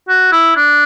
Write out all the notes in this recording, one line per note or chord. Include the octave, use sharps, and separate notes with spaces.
F#4
E4
D4